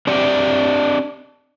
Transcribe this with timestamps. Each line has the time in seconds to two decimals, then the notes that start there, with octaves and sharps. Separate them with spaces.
0.07 C4 D4 G4 D5 E5 F#5